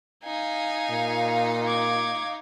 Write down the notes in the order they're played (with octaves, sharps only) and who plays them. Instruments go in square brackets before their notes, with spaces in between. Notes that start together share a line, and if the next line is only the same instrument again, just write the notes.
[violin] D#4 F5 [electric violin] G#5
[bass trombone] A#2
[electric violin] D6 G#6